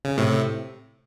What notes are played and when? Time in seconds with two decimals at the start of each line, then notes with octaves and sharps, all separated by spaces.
0.05 C#3
0.18 A2 C3